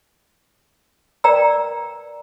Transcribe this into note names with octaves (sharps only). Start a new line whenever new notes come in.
A#4 B4 D5 G5 A#5 E6